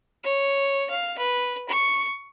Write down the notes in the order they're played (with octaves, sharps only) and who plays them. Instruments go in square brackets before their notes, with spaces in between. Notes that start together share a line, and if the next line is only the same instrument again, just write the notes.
[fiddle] C#5
F5
B4
C#6